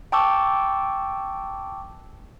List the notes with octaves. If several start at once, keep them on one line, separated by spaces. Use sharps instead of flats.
G5 A5 C#6 D6 E6